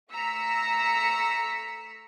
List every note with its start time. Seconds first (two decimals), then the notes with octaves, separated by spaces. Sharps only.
0.13 A3 A#5 E6 B6 C#7